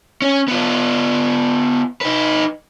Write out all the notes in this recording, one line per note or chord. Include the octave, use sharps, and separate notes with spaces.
C#4
B3 F4
D#4 B4